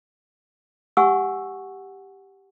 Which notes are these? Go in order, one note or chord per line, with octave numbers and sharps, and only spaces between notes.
G4 F#5 G#5 C#6 E6